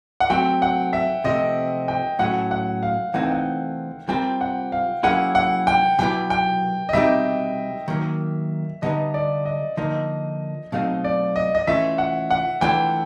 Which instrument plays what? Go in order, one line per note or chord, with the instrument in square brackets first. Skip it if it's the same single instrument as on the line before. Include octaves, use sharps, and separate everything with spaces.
[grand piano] F#5
[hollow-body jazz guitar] F#3 A3 C4 [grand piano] G5
[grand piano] F#5
E5
[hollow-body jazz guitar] C3 F3 A3 C4 [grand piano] D#5
[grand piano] G5
[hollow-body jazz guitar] A2 F#3 A3 C#4 [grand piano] F#5
[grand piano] F#5
F5
[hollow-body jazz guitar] E3 A3 C4 D#4 [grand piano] F#5
[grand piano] G5
F#5
[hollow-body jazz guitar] G3 C4 F4 A#4 [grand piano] G5
[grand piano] F#5
F5
[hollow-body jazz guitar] F#3 A#3 C#4 E4 G#4 [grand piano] F#5
[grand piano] F#5
G5
[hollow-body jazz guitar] B2 F#3 B3 E4 G4 [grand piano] G5
[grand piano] G5
D#5
[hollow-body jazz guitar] B2 G3 C4 D#4 G4 [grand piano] E5
[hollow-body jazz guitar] D#3 F#3 A#3
[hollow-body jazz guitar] D3 G3 B3 D#4 [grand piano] D#5
[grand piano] D5
D#5
[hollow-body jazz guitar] D3 F3 A#3 D#4 [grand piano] D#5
[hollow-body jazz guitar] B2 F#3 A3 C4 D#4 [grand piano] F5
[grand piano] D5
D#5
D#5
[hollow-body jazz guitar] E3 A3 C#4 F4 [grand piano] E5
[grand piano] F#5
F#5
[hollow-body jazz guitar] E3 A3 D4 F4 [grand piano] G5